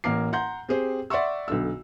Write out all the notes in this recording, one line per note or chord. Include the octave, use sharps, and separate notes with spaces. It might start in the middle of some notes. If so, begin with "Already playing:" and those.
A1 A#3 A#4 D6 C7
F#5 A#5 C6 G6
C4 G4 G#4 C5
D5 E5 F#5 C6 C#6 E6
B1 D3 E6